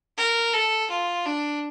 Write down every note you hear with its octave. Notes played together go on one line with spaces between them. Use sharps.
A#4
A4
F4
D4